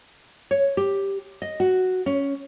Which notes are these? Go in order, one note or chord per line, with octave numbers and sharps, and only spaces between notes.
C#5
G4
D#5
F#4
C#4